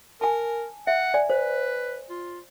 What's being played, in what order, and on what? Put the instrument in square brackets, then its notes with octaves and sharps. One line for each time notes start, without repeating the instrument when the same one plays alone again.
[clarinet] A#4 [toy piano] G#5 A5
[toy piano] E5 [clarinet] F#5
[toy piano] D5 G#5
[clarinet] B4 [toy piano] C5
[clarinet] F4